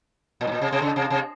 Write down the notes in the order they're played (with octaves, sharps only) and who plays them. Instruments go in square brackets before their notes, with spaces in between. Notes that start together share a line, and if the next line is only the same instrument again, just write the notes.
[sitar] A#2
G#2
A#2
C3
C3
C#3
C3
C3